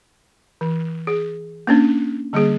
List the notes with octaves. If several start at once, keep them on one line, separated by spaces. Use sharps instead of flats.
E3
G#4
A#3 C#4 D4
D3 G3 A#3 G#4